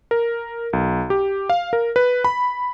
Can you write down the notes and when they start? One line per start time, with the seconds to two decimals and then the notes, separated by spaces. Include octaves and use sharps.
0.11 A#4
0.73 B1
1.10 G4
1.50 F5
1.73 A#4
1.96 B4
2.24 B5